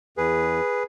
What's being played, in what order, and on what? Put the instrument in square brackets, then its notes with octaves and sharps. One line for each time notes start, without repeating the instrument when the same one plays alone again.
[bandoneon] E2 G#4 B4